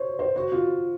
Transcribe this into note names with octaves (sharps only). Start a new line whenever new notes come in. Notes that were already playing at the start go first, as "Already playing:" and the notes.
Already playing: C5 C#5
C5
F#4
F4